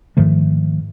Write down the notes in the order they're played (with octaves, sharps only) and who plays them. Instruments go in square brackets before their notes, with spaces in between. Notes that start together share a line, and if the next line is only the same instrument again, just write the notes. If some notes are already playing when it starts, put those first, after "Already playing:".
[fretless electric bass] G#2 D#3 F3 A3